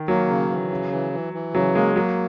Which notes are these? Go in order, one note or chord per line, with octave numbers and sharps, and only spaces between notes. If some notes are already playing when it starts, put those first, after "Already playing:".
Already playing: D#3
F#3 A#3
C#3
E3
C#3
E3
E3
E3
C#3 F#3
G#3 A#3
F#3 A#3